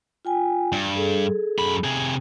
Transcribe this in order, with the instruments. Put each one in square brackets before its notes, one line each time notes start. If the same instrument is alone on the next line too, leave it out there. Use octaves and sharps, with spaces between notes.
[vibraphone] F4 G5 G#5
[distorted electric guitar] G2
[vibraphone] G#4 A4
[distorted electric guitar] F#2 B5
C3 G#4